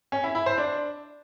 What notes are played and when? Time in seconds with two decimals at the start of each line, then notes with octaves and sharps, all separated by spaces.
0.12 C#4
0.24 E4
0.35 E4
0.46 C5
0.58 D4